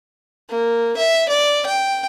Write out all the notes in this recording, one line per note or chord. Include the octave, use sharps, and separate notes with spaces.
A#3
E5
D5
G5